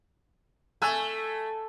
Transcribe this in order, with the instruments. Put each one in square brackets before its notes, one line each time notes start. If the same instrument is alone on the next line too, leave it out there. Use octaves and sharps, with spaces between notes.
[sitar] A3 [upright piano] G#5 E6